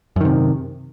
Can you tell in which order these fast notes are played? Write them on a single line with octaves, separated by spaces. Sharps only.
F#2 D#3 C3